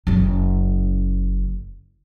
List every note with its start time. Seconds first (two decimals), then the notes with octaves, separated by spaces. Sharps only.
0.07 F#1 C#3